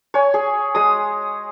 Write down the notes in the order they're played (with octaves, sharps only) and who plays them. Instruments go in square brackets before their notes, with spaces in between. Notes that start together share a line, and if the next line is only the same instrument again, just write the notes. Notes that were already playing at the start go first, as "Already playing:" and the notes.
[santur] C#5 G#5
G#4
G#3 D#6